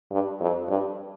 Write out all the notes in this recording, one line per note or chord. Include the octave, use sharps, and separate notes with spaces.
G2
F2
G2